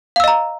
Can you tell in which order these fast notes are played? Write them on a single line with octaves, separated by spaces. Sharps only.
F5 E6 D#5 A#5